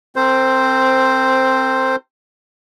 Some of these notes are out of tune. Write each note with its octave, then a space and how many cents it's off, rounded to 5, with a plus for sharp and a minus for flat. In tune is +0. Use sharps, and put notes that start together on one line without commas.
C4 +5 A4 +45 C5 +0